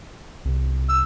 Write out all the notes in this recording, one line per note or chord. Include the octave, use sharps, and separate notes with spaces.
C2
E6